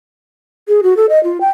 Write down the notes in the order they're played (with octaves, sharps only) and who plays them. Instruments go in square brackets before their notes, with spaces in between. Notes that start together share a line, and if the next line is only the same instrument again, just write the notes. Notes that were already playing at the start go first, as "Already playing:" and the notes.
[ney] G#4
F#4
A4
D#5
F4
G5